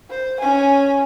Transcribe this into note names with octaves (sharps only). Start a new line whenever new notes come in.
C5
C#4 G#5